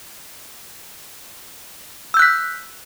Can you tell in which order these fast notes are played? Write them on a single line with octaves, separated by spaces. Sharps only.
E6 G6 F#6 B6